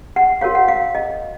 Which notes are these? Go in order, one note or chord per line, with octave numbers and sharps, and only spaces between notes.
F#5
F#4 A#4 C#5 F5
F#5
F5
D#5